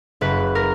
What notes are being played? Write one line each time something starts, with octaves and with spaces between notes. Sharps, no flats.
F#1 B4
A#4